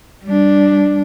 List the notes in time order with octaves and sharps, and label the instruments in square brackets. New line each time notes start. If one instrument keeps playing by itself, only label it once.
[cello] G3 D4